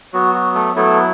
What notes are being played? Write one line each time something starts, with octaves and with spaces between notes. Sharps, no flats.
F#3 B3 F#4
F#4
A3 A4
F#3 A3 B3 E4 A4